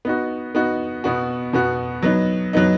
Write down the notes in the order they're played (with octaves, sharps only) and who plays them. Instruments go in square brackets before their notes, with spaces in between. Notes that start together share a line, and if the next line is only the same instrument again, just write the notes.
[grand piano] B3 D#4 F#4
B3 D#4 F#4
B2 B3 F#4
B2 B3 F#4
F#3 B3 D#4
F#3 B3 D#4